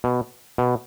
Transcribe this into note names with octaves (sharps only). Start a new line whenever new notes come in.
B2
B2